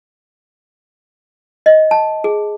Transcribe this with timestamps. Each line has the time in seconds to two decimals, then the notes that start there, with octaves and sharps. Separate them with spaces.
1.66 D#5
1.91 A5
2.24 G#4